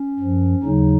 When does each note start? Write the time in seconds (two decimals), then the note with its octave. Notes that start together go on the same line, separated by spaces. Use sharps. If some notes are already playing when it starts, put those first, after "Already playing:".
Already playing: C#4
0.19 F#2 F3
0.63 D#2 C#3 F#3 D#4